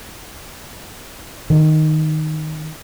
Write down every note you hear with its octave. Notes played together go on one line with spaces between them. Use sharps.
D#3